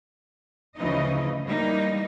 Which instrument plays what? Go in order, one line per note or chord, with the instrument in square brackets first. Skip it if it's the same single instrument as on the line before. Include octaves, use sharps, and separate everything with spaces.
[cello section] D2 C#3 E3 F3 D#4 D#5
E3 G3 A#3 D#4